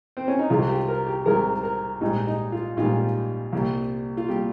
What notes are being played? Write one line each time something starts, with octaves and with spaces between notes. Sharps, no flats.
C4
C#4
D#4
C2 C3 D#3 G#3 F4
G4
A#4
G4
C2 C3 D#3 G#3 A#4
A#4
A#1 G#2 D#3 G3 D#4
D#4
F4
A#1 G#2 D#3 G3 F4
C2 A#2 G3
F4
A#2 G3 G4